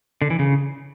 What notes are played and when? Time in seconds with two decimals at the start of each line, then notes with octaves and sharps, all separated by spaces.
0.22 D3
0.30 E3
0.39 C#3